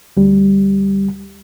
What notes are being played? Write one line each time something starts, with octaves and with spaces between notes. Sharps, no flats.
D2 G3